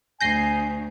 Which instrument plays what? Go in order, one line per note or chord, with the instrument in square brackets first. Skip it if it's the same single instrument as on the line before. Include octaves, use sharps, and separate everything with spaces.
[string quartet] D2 [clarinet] G#5 [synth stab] G6 A#6 C7